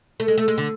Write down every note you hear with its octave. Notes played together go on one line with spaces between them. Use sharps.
A3
G#3
A3
G#3
D3